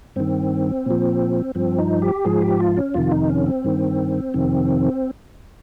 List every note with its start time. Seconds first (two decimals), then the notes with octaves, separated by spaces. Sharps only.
0.16 G2 D#3 C4
0.86 A#2 F3
1.55 G2 F3 C4
1.78 D#4
2.02 G4
2.25 G#2 F3 G#4
2.42 G4
2.60 F4
2.77 C#4
2.94 F2 C3 D#3 F4
3.11 D#4
3.30 C#4
3.46 C4
3.64 G2 D#3
4.34 F2 C3 D#3